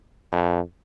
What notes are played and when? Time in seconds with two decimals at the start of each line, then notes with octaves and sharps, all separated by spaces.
0.32 F2